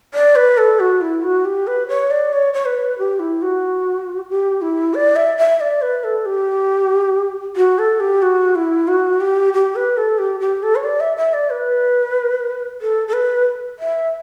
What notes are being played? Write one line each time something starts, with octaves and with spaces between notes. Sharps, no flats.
D5
B4
A4
F#4
E4
F#4
G4
B4
C#5
D5
C#5
C#5
B4
G4
E4
F#4
G4
E4
D5
E5
E5
D5
B4
A4
G4
F#4
A4
G4
F#4
E4
F#4
G4
G4
B4
A4
G4
G4
A4
C#5
D5
E5
E5
D5
B4
A4
A4
B4
E5